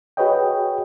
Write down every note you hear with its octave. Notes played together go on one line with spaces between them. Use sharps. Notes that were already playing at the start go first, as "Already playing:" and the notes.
F#4 G#4 B4 C#5 D#5 G5